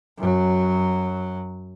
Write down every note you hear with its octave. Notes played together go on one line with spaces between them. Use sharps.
F#2 F#3